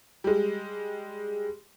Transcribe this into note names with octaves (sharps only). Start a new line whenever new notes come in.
G3 G#3